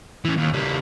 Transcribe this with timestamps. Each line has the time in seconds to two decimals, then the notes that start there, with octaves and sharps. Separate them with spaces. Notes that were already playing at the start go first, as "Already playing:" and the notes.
0.25 E3 C#4
0.38 D#2
0.53 C#3 G3